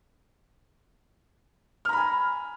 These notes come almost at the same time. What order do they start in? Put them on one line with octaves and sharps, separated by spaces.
F6 A#5 B5 G#5